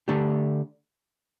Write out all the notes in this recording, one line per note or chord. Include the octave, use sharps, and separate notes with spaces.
D3 A3 D4 G4